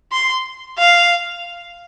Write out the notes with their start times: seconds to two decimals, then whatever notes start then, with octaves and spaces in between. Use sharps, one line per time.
0.12 C6
0.79 F5